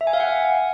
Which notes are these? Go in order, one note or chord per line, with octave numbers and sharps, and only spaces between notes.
E5
G#5
F5
F#5